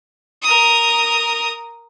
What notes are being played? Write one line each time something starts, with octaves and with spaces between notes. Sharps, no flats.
A#4 D#6